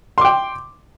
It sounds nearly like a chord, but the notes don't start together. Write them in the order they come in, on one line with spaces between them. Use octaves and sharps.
C6 D6 G5